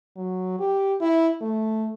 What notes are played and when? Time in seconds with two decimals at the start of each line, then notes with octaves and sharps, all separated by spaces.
0.17 F#3
0.59 G4
1.01 E4
1.41 A3